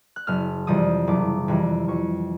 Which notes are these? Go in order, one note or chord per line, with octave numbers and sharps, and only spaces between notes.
F#6
F#1 F6
F2 C3 E3 G3 D#6
F#1 D6
F2 C3 E3 G3
F2 C#6